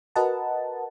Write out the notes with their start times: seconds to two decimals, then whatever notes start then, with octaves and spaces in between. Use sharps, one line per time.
0.16 F#4 A#4 B4 D#5 F#5 A5